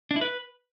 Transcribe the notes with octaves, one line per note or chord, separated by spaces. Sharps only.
D4
E4
B4